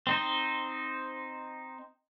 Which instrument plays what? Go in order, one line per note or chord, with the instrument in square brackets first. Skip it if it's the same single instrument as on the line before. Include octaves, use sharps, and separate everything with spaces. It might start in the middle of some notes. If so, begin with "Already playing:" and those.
[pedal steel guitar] C4 D#4 C5